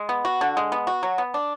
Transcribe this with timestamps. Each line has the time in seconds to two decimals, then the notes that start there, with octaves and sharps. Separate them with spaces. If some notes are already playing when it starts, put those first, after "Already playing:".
Already playing: G#3
0.09 B3
0.25 F#4
0.41 D3
0.57 G#3
0.72 B3
0.87 F#4
1.03 F#3
1.18 B3
1.34 D4